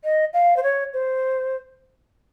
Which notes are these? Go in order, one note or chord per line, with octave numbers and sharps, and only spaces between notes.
D#5
F5
C5
C#5
C5